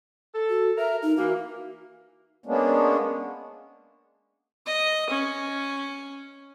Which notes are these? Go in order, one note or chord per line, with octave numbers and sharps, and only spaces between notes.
A4
F#4
A#4 E5
D#4
E3 A#3 F#4
G#3 A#3 B3 C#4 D4
D#5
C#4